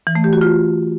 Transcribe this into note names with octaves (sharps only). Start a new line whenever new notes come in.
E3
A3
G4
F#4
F4